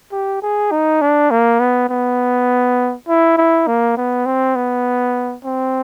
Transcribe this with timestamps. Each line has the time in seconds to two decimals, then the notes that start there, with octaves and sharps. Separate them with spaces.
0.12 G4
0.42 G#4
0.71 D#4
1.01 D4
1.31 A#3
1.60 B3
1.89 B3
3.08 E4
3.38 E4
3.67 A#3
3.97 B3
4.26 C4
4.56 B3
5.44 C4